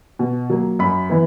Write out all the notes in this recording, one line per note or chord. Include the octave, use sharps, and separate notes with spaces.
B2
F#3 A#3
F#2 B5
E3 B3